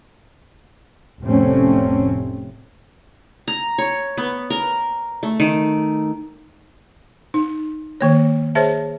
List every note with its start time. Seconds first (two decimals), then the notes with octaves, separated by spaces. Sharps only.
1.20 F1 A2 G3 A3 C4 C#4
3.48 A#5
3.78 C#5
4.17 B3
4.50 A#4
5.23 A3
5.40 D#3
7.34 D#4
8.01 D#3 A#3 C#5
8.55 G#4 C5 C#5 E5 A5